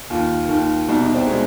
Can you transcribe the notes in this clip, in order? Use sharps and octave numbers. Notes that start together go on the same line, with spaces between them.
D#2 D#3 F4
D#2 D#3
C2 B2 D#4
D4
C4
B2 G#3